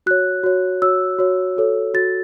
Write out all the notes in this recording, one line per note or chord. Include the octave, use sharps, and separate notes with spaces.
F#4 C#5 F#6
F#4 C#5
F#4 C#5 E6
F#4 C#5
F#4 A4 C#5
F#4 A4 C#5 A6